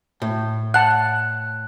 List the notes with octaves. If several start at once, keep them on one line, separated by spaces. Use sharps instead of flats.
A2
F#5 A5 F#6